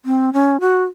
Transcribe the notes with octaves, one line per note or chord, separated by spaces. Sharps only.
C4
C#4
F#4